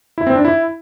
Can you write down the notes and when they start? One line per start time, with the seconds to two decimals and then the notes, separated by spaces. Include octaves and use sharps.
0.18 E4
0.27 C4
0.36 D4
0.45 E4